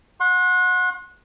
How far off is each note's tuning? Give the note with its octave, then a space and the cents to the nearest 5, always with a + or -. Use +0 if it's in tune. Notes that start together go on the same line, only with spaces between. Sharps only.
F#5 -20 C6 +35